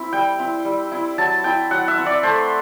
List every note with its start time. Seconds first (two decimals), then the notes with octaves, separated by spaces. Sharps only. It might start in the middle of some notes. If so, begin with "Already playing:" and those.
Already playing: C4 E4
0.13 G3 G5
0.39 C4 E4
0.65 G3
0.92 C4 E4
1.18 F#3 A5
1.44 C4 E4 G5
1.71 F#3 F#5
1.88 E5
1.97 C4 E4
2.06 D5
2.23 A3 C5